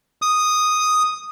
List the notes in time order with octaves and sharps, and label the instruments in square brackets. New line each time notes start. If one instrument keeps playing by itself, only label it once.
[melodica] D#6